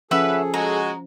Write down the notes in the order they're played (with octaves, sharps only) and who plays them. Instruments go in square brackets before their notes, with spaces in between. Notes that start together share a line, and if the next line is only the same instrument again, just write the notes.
[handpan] F3 C#4 [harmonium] G#4 A4 [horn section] B4 [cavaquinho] E5 F#5 C#6
[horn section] G#3 F#4 [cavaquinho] A#5